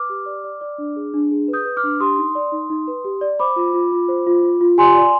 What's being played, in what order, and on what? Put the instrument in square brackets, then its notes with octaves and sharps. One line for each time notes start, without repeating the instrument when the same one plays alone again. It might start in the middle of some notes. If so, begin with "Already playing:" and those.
Already playing: [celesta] B4 D6 F6
G4
D5
D5
D5
D4
G#4
D4
G#4
B4
D#6 G6
B4
D6 F6
D4
G4 C6 D#6
D#4
D5
D#4
D#4
B4
G4
D5
C5 B5 D6
F4
F4
F4
C5
F4
F4
F4
G4 G#5 C6
D5